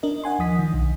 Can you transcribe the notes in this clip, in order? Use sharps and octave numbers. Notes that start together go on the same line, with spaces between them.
D4 A#4 D#5
D#5 F#5 G#5 C6
D#2 F3 D#6 B6
D#3
B1